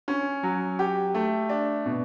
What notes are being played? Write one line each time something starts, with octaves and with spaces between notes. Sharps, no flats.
C#4
F#3
G4
A3
D4
B2